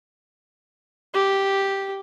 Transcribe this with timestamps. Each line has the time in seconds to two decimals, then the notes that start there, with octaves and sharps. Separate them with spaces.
1.14 G4